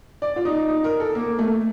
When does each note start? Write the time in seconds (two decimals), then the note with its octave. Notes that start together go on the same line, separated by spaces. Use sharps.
0.22 D5
0.36 F4
0.45 D#4
0.69 D#4
0.84 A#4
1.00 A4
1.15 A#3
1.39 A3